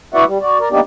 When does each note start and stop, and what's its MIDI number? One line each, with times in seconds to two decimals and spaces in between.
0.14 0.24 64
0.14 0.24 66
0.14 0.24 71
0.14 0.24 74
0.14 0.24 76
0.14 0.24 78
0.27 0.38 55
0.41 0.58 66
0.41 0.58 74
0.60 0.69 70
0.60 0.69 74
0.71 0.80 58
0.71 0.80 59
0.71 0.80 62
0.71 0.80 63
0.71 0.80 67
0.71 0.80 74